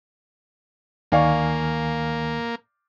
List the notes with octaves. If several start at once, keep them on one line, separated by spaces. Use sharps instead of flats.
D2 D#3 A#3 D5 F5 G#5 C#6